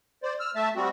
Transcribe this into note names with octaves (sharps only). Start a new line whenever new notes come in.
C5 D5
E6 F6
A3 E5 A5
G3 C4 F#4